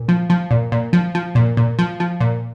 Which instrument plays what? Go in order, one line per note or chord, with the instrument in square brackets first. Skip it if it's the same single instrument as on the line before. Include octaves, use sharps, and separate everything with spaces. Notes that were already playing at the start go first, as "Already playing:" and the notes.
Already playing: [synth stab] A#2
F3
F3
A#2
A#2
F3
F3
A#2
A#2
F3
F3
A#2